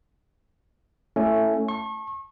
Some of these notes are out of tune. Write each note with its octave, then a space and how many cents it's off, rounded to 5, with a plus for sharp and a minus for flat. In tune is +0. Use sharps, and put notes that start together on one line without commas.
A3 +5 C#4 +0 E4 +0
A5 +0 C#6 -35